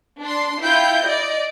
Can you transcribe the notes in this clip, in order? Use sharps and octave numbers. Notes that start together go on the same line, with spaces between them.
D4 C6
E4 F4 G5 G6
D5 D#5